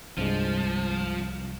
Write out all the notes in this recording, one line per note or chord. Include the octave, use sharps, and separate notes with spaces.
C2 G2 F3 G#3